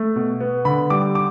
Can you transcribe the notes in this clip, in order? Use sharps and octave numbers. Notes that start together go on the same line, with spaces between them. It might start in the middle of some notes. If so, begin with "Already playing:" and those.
Already playing: A3
B2
B3
D3 B5
G3 D6
D6